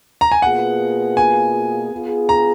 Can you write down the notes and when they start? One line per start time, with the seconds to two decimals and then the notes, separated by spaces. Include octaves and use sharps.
0.21 A#5
0.31 G#5
0.42 B2 A#3 F4 G#4 B4 F#5
1.17 G#5
1.91 B3 F4 G#4
2.29 A#5